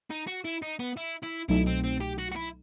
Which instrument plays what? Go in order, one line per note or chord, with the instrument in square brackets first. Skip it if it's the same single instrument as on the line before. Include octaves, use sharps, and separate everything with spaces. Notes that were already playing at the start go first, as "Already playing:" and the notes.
[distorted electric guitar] D#4
F#4
E4
D#4
B3
E4
E4
[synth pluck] C2 B2 F#3 A3 D#4 [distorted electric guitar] E4
[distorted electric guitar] C4
C4
G4
F#4
F#4
E4